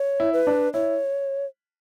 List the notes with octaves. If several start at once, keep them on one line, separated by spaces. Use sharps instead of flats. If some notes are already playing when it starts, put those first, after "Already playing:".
Already playing: C#5
E4
B4
D4
E4 C#5